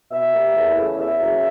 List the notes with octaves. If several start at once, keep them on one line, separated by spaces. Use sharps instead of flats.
B2 E5
G3 A#3
E2
C#3 E3 A3
E2 E5
C#3 F#3 A#3